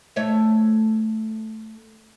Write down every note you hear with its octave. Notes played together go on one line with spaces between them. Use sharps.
A3 C#5 E5